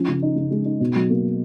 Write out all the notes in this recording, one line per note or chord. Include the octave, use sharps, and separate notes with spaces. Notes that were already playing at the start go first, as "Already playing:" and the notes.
Already playing: F3 C#4
C#3
D#4
C#3
G#3
D#4
B2
F#3
A#3